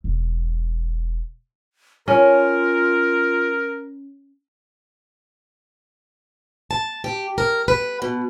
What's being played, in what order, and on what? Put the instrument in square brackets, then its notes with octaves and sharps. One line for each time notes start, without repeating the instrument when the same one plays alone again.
[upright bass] E1
[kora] C#4 [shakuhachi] F4 [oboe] A#4
[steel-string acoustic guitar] A5
G4
A#4
B4
B2